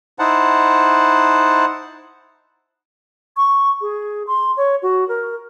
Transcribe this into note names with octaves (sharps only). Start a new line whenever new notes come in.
D#4 E4 C5 F#5 A5
C#6
G#4
C6
C#5
F#4
A#4